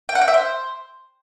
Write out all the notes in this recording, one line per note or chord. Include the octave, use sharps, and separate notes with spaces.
G5
F#5
G5
E5
C5